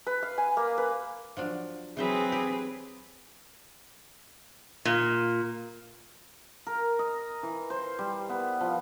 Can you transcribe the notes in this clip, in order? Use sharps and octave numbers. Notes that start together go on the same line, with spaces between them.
B4
F5
G#5
A#3
B4
F3 F#3 D4
E3 F#3 C4 G#4 B4 C5 E5
G4
A#2
A#4
D#5
E3
C5
G3
B3
F3